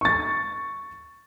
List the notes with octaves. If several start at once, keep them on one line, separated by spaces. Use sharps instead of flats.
C#6 A6